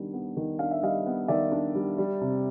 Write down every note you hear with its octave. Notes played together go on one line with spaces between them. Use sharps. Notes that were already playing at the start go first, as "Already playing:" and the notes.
Already playing: D#3 G3 B3 D4
B3
D#3
D4 F5
E5
G3 D#5 F5
B3
D#3 D5 E5
D4
G3
G3
C3